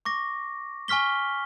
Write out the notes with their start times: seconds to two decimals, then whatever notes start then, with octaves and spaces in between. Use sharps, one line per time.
0.05 C#6 D6 A#6
0.88 G#5 C#6 F6 B6 G7